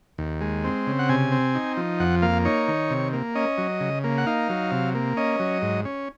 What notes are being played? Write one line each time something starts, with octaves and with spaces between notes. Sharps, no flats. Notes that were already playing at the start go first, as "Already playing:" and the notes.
D#2
G#3
C4
C#3
F#5
C3 G#5
C4
D#4
F3
F2 F#5
A#3 F5
D#4 C#5
D#3
C3
A#3
C#4 D#5
F#3
C#3
A#3
F#5
D#4 F5
F#3
C3
A#3
C#4 D#5
F#3
G#2
C#4